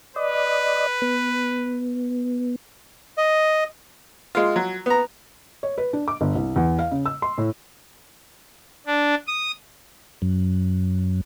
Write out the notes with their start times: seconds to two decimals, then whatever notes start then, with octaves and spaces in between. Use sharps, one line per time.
0.16 B4 D5 D#5
1.02 B3
3.17 D#5
4.35 G#3 F4
4.56 F#3
4.86 B3 A#5
5.63 C#5
5.78 B4
5.93 D4
6.08 D6
6.21 G1
6.35 C2
6.56 E2
6.79 F5
6.92 C#3
7.06 E6
7.22 C6
7.38 A2
8.86 D4
9.28 D#6
10.22 F#2